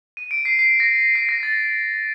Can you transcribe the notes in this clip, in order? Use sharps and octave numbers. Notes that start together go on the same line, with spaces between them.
D#7
D7
C7
C7
A#6
C7
A#6
A6